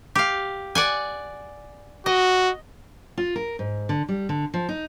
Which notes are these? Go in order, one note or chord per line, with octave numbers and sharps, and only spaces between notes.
G4 F5
D5 F#5 G#5
F#4 D#5
F4
A#4
G#2
D3
G3
D3
F3
D#4